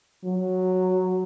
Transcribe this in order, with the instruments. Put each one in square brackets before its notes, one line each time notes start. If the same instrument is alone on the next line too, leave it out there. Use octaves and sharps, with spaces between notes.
[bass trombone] F#3